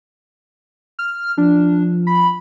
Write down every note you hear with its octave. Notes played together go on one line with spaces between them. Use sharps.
F6
F3 D4
B5